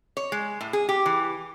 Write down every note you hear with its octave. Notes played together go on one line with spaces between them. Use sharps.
C#5
G#3
A2
G#4
G4
E3